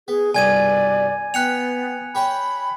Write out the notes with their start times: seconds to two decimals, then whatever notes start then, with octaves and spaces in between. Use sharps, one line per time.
0.08 B3 G#4
0.34 C2 G2 B2 D5 G#5 G#6 D#7
1.34 B3 G5 B5 F#6 C#7 F7
2.15 G4 C#5 G5 B5